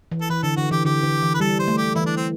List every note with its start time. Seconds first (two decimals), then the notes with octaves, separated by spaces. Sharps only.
0.11 E3
0.21 A4
0.29 E3 B4
0.43 D3 A4
0.57 D3 F#4
0.71 E3 G4
0.85 D3 G4
1.04 D3
1.22 E3
1.34 B4
1.40 G3 A4
1.59 C5
1.68 A3
1.77 G4
1.96 E3 E4
2.06 D4
2.17 C4